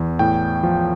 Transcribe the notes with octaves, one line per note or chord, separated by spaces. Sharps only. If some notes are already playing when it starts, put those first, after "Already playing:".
Already playing: E2
A2 G5
F3